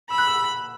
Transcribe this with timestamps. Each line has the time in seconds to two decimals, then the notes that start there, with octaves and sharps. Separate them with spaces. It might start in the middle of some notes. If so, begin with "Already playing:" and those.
0.10 B5 E6
0.18 F#6
0.27 E6